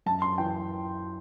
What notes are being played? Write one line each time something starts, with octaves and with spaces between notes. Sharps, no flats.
F#2 A5
C6
E3 G5